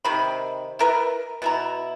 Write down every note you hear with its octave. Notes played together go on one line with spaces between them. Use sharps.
C3 D#3 B5
E4 A#4 B4
B2 E4 A#5